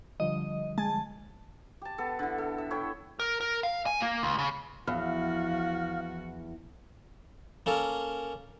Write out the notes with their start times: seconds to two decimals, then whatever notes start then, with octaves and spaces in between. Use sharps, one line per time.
0.20 D3 F3 G3 D#5
0.78 G#3 G#5 A5
1.82 G4 A5
1.98 B3 A4
2.19 D3 E4
2.38 A4
2.58 E5
2.71 E4 C#5 E5 G5
3.20 A#4
3.41 A#4
3.63 F5
3.86 G#5
4.01 A#3
4.23 C#2
4.39 C#3
4.87 E2 F3 F#4 F5
7.66 A#3 C#4 A4 A#4